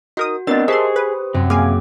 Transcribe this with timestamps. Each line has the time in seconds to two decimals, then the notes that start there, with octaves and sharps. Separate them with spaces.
0.17 D#4 F#4 A#4 D#6
0.47 B3 C4 D4 A#4 D#5 A6
0.68 G4 G#4 C5 E5 A5 C6 D#6
0.96 B4
1.34 F#2 C3
1.50 A#3 G#4 F5 G#5 D6